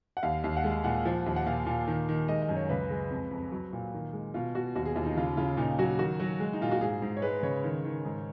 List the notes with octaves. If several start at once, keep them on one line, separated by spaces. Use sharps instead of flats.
F#5
D#2 F5
D#2
F#5
G#3
F5
A#2 F#5
F3
D#2
F#5
A#2 F5
A#2
D#3
D#3
G#3 D#5
D#5
F#2
C#5
C#2 B4
G#3
F2
F2
F#3
A#2
D#3
G#3
B2 F4
B2 F#4
D#2 F#4
G#4
D#2 F4
D#4
C#3 F4
C#3 F4
A#2 D#4
F#3 F#4
D#3 F#4
F#3
G#3
D#4
A#2 F4
F#4
G#2 G#4
G#2
C#5
G#3 B4
C#3 C#5
D#3
D#3
G#2